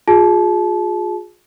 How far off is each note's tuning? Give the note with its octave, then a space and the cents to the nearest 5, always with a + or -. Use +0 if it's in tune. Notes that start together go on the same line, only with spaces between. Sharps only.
F4 +30 G#4 +0 A5 -25